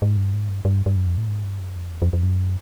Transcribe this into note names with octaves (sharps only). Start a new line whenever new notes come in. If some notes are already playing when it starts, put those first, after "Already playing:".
G#2
G2
G#2
G2
G2
G2
F#2
F2
A2
G#2
G2
F#2
F2
E2
F2
F2
F#2